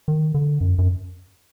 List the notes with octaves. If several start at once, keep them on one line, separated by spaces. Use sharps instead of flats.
D#3
D3
F#2
F#2